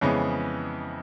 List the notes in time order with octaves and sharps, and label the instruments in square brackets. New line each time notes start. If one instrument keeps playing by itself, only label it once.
[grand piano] F2 C#3 E3 G#3 B3